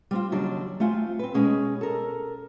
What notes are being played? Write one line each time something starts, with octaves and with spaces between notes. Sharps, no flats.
G3 C4 F4
D#2 C#3 F#3 G3 D4 D5
A3 C4 F4 G#5
C4 B4
B2 G#3 C#4 G#4
A4 A#4